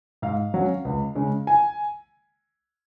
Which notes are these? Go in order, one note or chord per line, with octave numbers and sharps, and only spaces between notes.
G#2 F5
F#3 C#4
C#2
C#3 G#3
G#5